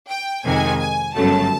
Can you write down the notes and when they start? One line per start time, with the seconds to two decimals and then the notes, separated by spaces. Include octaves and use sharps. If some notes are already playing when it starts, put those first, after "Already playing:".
0.09 G5
0.44 F2 C3 D#3 G#3 G#5
0.80 G#5
1.14 G1 F#2 C#3 F#3 A3 A5